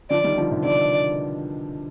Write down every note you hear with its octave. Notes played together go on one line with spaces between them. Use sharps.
D3 F3 D5
D#3 G3
D3 F3
C3 D#3
B2 D3 D5